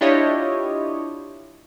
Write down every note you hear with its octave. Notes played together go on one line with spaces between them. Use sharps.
D4 E4 F4 G4 C#5 D#5